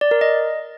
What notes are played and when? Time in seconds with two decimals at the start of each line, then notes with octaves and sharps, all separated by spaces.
0.01 D5
0.11 A#4
0.21 D#5